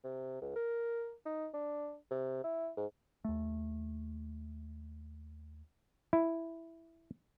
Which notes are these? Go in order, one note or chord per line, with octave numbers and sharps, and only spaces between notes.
C3
C#2
A#4
D#4
D4
C3
E4
G#2
D#2 A3
E4